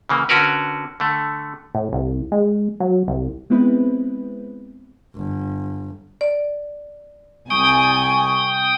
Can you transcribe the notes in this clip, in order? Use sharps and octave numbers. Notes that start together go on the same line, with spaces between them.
C#3 E3 A#3
D3 C#4 F#4 A#4 B4
D3 A3
A2
C2
G#3
F#3
C2
G#3 B3 C4 E4 B4
G1
D5
C2 G5 G#5 C#6 D#6